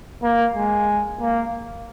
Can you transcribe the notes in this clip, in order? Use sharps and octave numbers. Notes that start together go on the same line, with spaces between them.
A#3
G#3
A#3